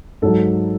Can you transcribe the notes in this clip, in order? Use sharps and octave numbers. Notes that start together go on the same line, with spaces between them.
G#2 F#3 A4